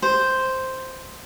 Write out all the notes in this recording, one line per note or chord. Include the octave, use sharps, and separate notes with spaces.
C5